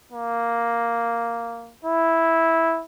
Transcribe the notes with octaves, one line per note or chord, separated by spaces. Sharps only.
A#3
E4